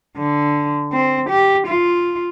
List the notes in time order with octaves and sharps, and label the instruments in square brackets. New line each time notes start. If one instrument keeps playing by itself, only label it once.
[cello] D3
C4
G4
F4